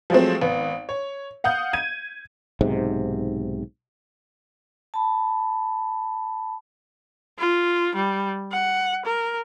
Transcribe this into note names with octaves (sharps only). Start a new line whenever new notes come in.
F3 F#3 G#3 A3 C4
G#1 B3
C#5
F5 F#5 D#6 G6
G#6 D#7
B1 G#2 C3
A5 B5
F4
G3
F#5
A#4